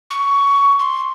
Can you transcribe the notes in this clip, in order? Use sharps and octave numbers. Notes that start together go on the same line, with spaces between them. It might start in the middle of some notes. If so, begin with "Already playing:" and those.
C#6
C6